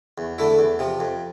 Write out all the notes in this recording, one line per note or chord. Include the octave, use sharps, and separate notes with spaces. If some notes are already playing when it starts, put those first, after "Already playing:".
E2
D3 A3 E4
E2
C3 F3
F2